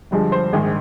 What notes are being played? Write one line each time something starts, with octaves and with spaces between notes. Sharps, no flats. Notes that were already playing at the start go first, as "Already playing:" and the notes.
G1 G2 F3 G#3
C5
A#1 G#2 D#3 G#4